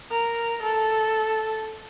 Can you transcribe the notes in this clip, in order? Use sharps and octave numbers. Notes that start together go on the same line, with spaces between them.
A#4
A4